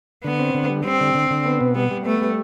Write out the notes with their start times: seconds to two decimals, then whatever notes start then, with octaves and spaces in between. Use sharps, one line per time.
0.24 D3 B3
0.39 C4
0.54 D3
0.70 G3
0.85 G3 C4
1.00 D3
1.15 D3
1.30 D3
1.46 B3
1.61 B2
1.75 G3 B3
1.91 G3
2.05 A3 B3
2.21 G3